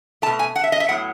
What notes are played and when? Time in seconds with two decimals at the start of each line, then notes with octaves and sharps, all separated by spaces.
0.22 A3 A5
0.26 B2
0.39 G#5
0.56 F#5
0.64 E5
0.72 D#5
0.80 E5
0.89 A2 F#3 B3 F#5